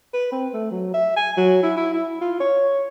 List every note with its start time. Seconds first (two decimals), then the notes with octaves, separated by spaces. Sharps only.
0.13 B4
0.32 C4
0.53 A3
0.71 F#3
0.94 E5
1.16 G#5
1.37 F#3
1.63 E4
1.77 E4
1.93 E4
2.21 F4
2.40 C#5